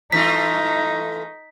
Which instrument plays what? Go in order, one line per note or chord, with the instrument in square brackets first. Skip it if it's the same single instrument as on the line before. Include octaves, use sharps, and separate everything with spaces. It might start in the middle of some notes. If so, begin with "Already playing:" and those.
[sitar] E3 A3 F4 [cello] D#4 [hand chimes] B6